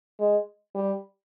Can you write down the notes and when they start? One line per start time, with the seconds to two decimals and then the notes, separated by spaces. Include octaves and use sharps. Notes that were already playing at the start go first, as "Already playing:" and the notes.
0.20 G#3
0.75 G3